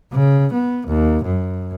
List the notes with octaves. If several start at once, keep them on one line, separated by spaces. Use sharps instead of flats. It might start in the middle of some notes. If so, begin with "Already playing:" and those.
C#3
B3
D#2
F#2